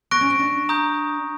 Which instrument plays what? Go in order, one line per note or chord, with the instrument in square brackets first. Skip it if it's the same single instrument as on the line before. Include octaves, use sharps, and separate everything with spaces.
[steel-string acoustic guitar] B3 [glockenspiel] C#6 F#6 A#6 D7
[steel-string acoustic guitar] C#4
C4
D4
[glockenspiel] A#5 D#6 G6